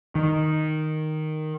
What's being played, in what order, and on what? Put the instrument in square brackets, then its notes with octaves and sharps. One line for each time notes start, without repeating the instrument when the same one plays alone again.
[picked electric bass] D#3